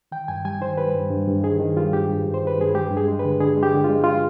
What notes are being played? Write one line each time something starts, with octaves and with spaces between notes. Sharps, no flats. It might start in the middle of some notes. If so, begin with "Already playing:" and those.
D#3 G5
G2 G#5
G3 G#5
D#3 C5
G3 B4
G2
G2
G2
D#3 G#4
D#3
G3 F4
G2 G4
G2
G2
C5
D#3
B4
G2 G#4
G#3 G4
G2
G#4
G#3
B4
D3
D3 G#4
G#3
G4
D3
F4
G#3
F4